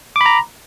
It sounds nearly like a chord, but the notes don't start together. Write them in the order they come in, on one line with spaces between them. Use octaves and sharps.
D6 B5 A#5